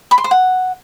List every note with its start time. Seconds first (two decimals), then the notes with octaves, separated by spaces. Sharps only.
0.11 B5
0.18 C6
0.24 C5
0.31 F#5